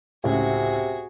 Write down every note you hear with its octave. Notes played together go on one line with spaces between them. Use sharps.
C#2 A2 C3 F#4 G#4